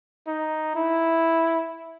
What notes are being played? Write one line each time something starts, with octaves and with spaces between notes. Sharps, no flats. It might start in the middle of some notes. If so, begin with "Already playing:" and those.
D#4
E4